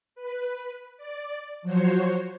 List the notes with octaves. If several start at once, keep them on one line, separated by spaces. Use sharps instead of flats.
B4
D5
F3 F#3 F#4 C5 C#5